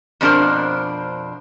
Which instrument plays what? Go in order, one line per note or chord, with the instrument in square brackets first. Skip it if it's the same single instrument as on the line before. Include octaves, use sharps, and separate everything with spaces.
[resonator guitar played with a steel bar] F2 B2 D4 A#4 C5